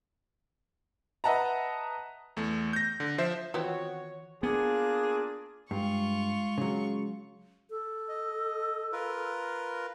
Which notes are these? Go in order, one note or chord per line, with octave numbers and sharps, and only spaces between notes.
B4 D#5 E5 F#5 A5 A#5
E2 A3
G6 A#6
D3
F3 C5 E5
D#3 E3 B3 C4 F4 F#4 C#5
A#3 B3 D4 F4 G#4
G2 G#3 F4 C#6
C#3 F#3
A4
D#5
F4 A#4 B4